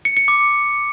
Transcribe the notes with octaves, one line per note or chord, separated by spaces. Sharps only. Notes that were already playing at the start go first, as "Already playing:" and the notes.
C#7
C#7
D6